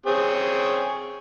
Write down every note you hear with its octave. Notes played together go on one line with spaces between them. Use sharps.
C4 G#4 C#5